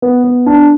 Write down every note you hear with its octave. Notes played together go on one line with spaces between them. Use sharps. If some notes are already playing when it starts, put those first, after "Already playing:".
B3
B3
D4